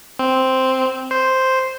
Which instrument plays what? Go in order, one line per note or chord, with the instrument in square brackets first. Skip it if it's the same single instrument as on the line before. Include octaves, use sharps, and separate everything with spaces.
[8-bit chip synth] C4
C5